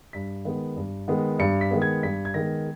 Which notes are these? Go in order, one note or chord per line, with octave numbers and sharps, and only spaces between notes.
G2 B6
D#3 G#3 B3
G2
D#3 G#3 B3
G2 C#7
B6
D#3 G#3 B3
G#6
G2 B6
G#6
D#3 G#3 B3 A#6